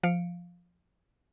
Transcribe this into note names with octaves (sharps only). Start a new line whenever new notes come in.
F3 F5 C#7 D7